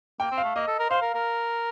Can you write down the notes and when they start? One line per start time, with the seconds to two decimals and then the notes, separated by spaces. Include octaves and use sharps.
0.20 A#3 G5
0.31 C4
0.37 F5
0.43 A3
0.56 A#3 D#5
0.67 A4
0.79 A#4
0.90 C5 F5
1.02 A#4
1.14 A#4